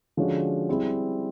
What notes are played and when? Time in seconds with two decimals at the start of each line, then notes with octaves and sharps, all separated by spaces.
0.17 D3 F3 G#3 C#4 F#4
0.69 G3 C4 E4 G#4